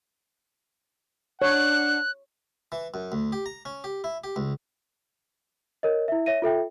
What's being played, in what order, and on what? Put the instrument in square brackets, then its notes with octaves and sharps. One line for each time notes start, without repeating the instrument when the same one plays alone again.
[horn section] D4 F#5 [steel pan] C#5 [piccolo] F#6
[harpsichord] E3
F#2
D2
G4
A#5
C#4
G4
E4
G4
C#2
[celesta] A#4 C#5 D#5
E4 E5
C#5 E5 A#6 D#7
F4 A4 E5 G5